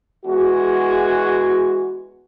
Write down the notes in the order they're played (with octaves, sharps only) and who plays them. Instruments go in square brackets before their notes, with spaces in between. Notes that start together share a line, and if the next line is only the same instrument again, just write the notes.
[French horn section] E2 G#3 F#4